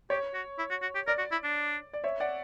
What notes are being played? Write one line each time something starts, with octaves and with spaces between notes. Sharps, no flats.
G4 C#5
F#4
E4
F#4
F#4
G4
A#4 D5
F#4
E4
D4
D5
C#5 E5
D5 F#5